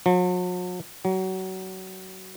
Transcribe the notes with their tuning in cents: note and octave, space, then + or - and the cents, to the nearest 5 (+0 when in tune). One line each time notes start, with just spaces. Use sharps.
F#3 -45
F#3 +25